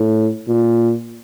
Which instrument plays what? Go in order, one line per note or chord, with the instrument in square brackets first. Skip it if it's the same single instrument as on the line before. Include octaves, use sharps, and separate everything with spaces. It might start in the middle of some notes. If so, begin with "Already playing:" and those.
Already playing: [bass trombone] A2
A#2